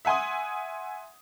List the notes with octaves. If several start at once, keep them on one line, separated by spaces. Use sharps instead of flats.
E5 F#5 G#5 C6 D#6